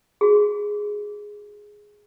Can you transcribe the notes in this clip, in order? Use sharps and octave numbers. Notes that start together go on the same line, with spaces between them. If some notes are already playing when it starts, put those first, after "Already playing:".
F#4 G#4